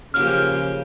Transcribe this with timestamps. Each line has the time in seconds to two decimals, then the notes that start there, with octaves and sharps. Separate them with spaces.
0.14 C#3 F3 A#3 G4 F6